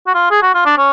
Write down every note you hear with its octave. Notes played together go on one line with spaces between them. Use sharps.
F#4
F4
G#4
F#4
F4
D4
C#4